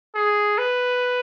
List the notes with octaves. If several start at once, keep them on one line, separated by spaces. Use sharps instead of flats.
G#4
B4